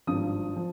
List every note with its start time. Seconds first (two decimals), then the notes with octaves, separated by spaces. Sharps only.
0.07 G#1 G2 F3 D#6
0.56 F3